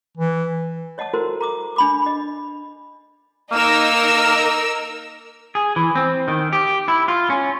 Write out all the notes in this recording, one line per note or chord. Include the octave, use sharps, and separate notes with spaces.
E3
C#5 D#5 F#5 A5 D#6
E4 F#4 A4 A#4 C5
A#5 D6 D#6
D4 B5 D6
D#5
A#3 D#4 A#4 E6
G#4
E3
C4
D#3
G4
E4
F4
C#4